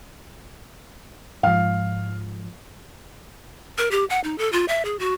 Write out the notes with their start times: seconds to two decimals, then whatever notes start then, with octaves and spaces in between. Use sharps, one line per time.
1.43 G#2 F3 F5
3.78 A#4
3.91 G4
4.10 F#5
4.24 D#4
4.38 A4
4.53 F4
4.68 E5
4.85 G#4
4.99 F#4